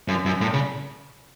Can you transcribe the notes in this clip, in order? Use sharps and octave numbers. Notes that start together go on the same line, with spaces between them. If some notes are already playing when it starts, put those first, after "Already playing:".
F#2
F#2
A2
C#3